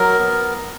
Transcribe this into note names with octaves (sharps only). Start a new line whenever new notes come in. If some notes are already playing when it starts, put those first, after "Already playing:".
Already playing: F#3 A#4
B3